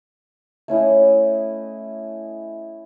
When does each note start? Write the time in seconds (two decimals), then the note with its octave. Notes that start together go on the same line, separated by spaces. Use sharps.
0.68 A3 C#4 E4 D#5